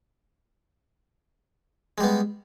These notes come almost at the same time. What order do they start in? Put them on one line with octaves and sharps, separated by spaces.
G#3 G3 B3